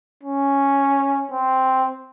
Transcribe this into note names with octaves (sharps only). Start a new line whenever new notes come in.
C#4
C4